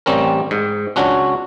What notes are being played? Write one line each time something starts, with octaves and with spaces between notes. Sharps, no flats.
A1 G3 C4 C#4 A#4
G#2
C#2 C#4 D4 F#4